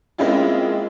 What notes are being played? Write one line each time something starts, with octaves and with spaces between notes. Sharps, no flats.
G#3 A#3 C4 C#4 E4 F4